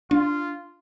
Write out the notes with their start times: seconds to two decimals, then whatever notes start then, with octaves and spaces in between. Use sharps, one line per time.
0.11 D4 F4